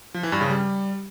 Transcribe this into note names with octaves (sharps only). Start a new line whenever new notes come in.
F3
E3
G2
C#3
G3